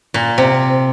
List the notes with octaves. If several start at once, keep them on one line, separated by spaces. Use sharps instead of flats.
A#2
C3